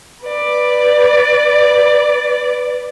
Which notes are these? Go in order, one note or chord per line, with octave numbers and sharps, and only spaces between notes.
B4 D5